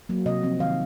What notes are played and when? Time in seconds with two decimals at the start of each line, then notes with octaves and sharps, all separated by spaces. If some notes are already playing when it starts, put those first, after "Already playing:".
0.09 F#3 A#3
0.26 C3 D#5
0.43 F3 C4
0.59 D#3 F5